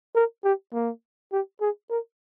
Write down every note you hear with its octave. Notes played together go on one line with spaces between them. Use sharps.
A#4
G4
A#3
G4
G#4
A#4